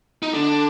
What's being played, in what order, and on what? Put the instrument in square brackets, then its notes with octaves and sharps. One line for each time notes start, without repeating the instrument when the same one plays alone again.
[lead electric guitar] D#4
[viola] D3 [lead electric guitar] D4